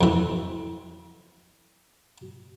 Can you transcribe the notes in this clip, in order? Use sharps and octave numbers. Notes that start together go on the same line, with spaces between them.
F2 E3